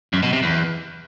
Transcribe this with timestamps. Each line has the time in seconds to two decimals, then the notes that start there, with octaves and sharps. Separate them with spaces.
0.13 F#2
0.23 B2
0.33 C3
0.43 E2